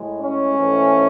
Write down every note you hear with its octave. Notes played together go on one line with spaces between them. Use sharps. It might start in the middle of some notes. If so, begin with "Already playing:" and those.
Already playing: A2 G#3
C#4
G#2 E3 A3